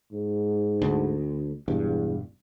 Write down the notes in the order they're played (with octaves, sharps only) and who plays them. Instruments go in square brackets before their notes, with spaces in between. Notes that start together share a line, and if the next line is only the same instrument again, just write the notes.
[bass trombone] G#2
[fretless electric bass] D2
[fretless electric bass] E1 G2 [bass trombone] E2